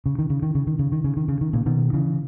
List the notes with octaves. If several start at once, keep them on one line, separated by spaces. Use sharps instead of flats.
C#3
D#3
C#3
D#3
C#3
D#3
C#3
D#3
C#3
D#3
C#3
D#3
A#2 C#3
B2 D#3
C#3 E3